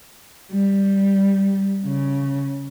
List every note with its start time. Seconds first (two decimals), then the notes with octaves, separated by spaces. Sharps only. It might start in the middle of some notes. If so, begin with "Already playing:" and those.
0.52 G3
1.85 C#3